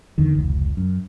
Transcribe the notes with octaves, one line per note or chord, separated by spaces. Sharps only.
E2 D3 D#3
F1 C#2
F#2